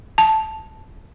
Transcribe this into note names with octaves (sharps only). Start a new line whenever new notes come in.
A5